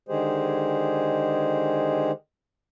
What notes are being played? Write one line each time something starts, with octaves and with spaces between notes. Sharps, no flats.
D3 D#3 G#3 G4 G#4 C5